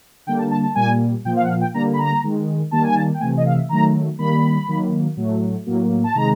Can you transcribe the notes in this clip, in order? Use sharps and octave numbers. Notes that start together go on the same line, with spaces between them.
D3 G3 A#3 G5
A5
A5
A5
A#2 G3 A#3 G#5
A#2 F3 A#3 G5
F5
F#5
F5
G5
D3 G3 A#3 A#5
B5
A#5
D#3 G#3
D#3 G3 A#3 A5
G#5
A5
G5
C3 E3 A3 G#5
D#5
F5
E5
D#3 F#3 A3 A#5
D#3 G3 A#3 B5
D#3 F#3 A#3
A2 F#3 A3
A2 F#3 A#3
A5
C3 D#3 G#3 A#5